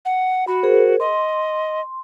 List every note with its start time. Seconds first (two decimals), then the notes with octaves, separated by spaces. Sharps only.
0.05 F#5
0.47 F#4 B5
0.63 G#4 A#4 C5
1.00 D#5 C6